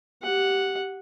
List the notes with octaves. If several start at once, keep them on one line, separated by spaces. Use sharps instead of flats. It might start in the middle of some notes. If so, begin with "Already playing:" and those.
G4 F#5